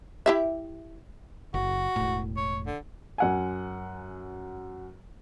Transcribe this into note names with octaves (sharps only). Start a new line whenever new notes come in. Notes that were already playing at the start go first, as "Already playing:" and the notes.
E4 G4 E5
F#1 F#4
E1 A2
C#5
D3
F#2 F#5 G#5